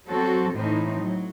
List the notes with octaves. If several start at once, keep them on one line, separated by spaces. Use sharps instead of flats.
F#3 C4 F#4 A4
A2 E3 C4 D#4
F#3